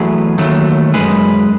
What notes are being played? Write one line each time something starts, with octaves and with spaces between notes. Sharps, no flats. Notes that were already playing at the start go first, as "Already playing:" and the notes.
Already playing: E2 F#3 A3 G#4 B4
D#2 D#3 F#3 A3
F#2 C#3 G#3 G#4 B4